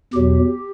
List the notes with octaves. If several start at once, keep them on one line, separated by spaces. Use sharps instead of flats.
E2 B2 F#3 G4